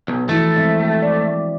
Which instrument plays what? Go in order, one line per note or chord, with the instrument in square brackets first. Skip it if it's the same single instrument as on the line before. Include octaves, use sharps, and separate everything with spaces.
[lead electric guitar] B1 [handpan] F#3
[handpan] E3 F3 E4 [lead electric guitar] A3
[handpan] G#3 C4 E5
D5